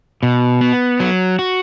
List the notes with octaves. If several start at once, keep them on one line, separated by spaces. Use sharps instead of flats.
B2
B3
F#3
F#4